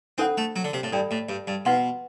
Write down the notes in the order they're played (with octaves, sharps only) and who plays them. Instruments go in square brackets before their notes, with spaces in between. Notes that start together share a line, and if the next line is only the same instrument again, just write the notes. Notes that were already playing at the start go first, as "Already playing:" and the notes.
[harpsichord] C4 [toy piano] D4 A4 C5 F#5 B5
[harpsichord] A3
F#3
D3
C3
A2
[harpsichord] G2 [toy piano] A4 D5 G5 B5
[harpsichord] A2
G2
G2
[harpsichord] B2 [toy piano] B4 F#5 C6